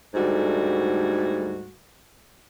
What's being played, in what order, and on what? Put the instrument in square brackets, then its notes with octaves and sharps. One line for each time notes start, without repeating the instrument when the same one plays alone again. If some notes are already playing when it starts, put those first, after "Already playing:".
[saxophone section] D2 G#2 G3 A3 F#4